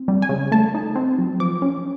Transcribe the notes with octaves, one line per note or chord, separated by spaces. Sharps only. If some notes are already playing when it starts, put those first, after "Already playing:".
Already playing: C4
G3
G#5
C#3
A3 A5
D#4
C4
F#3
F3 D6
C#4